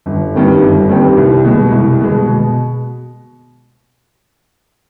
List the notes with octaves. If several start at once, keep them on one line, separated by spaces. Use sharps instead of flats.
G1
G2 D#3 G3 C4
G1
G2 D#3 G3 C4
C2
B2 G#3
C2
B2 G#3
B2